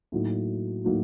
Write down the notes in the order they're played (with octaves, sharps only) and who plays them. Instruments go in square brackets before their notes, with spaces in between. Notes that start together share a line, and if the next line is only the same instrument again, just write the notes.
[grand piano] A2 F#3 A#3 D#4 F#4
A2 F#3 A#3 D#4 F#4